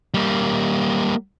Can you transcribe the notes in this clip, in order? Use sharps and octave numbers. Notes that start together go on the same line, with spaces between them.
G3 A#3